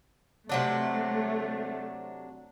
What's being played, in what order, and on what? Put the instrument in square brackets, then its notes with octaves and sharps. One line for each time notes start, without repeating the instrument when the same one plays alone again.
[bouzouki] C3 F#3 D4 [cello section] A3